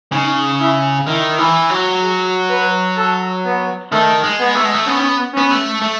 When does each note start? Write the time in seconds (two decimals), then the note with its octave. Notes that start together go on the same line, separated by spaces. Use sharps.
0.12 C#3 D#4
0.60 E4
1.07 D#3 E4
1.38 E3
1.70 F#3
2.02 G#4
2.49 B4
2.97 A4
3.45 B3
3.92 D#3 A3
4.23 G#3
4.39 B3
4.55 A3
4.65 G#3
4.74 A3
4.87 B3 C#4
5.34 B3 C#4
5.50 A3
5.82 A3